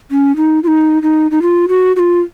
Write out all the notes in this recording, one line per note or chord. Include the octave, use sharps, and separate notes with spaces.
C#4
D#4
F4
D#4
D#4
D#4
F4
F#4
F#4
F4